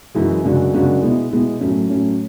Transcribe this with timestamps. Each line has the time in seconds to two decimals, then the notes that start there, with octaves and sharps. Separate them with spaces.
0.15 F#2 E3 G#3
0.44 F#2 C#3 G#3 D4 F#4
0.73 F#2 C#3 G#3 D4 F#4
1.02 B2 G#3 B3 E4
1.31 B2 G#3 B3 E4
1.60 A2 F#3 A3 C#4
1.88 A2 F#3 A3 C#4